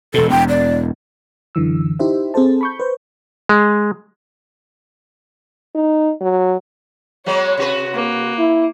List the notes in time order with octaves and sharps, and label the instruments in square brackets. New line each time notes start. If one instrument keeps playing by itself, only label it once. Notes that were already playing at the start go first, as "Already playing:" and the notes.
[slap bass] E1 B2 [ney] A4
[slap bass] E1 E2 [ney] G5
[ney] D5
[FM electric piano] F#2 D3 E3 E6
D#4 E4 G4 C5 E5
C4 G#4 A4 C5 A5
B5 C#6 G6
B4 C5
[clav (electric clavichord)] G#3
[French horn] D#4
F#3
[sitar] F#3 G#3 B3 [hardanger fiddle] C#5
[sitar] C3 F#4 B4
[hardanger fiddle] A#3
[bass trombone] E4